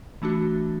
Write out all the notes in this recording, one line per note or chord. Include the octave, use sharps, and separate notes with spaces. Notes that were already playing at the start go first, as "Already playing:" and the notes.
E3 A3 D4 F#4